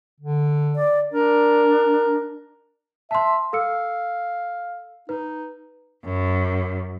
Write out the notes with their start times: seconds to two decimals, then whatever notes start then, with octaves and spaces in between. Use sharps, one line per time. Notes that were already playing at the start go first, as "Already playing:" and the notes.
0.21 D3
0.76 D5
1.12 D4 A#4
3.11 E5 A5 C6
3.53 A4 F5 E6 C#7
5.09 D#4 B4
6.04 F#2